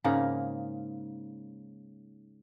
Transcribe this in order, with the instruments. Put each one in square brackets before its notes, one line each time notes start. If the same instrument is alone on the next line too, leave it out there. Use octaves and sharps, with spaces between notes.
[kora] G#2 C#3 A#3 D#4